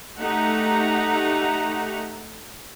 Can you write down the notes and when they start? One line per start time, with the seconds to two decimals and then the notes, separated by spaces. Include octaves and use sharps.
0.18 A3 D#4 G4 E5 F#5 A#5